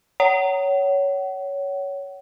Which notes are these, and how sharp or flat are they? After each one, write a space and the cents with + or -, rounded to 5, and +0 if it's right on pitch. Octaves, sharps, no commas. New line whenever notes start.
C#5 +15 F#5 +35